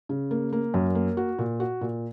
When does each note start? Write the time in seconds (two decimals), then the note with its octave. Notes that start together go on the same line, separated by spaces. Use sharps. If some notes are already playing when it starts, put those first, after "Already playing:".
0.09 C#3
0.31 A#3
0.53 A#3
0.74 F#2
0.95 A#3
1.17 F#4
1.39 A#2
1.60 F#4
1.81 A#2